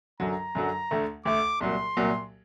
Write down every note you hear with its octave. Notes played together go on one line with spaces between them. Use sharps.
F#2 D3 F#3 A#5
F#2 D3 F#3
D2 D3 A3
D2 D3 A3 D6
C2 A#2 F#3 C6
C2 A#2 F#3